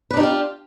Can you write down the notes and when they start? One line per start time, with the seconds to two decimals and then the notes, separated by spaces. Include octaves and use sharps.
0.11 B4
0.14 D4
0.17 D#4
0.20 G4
0.23 F4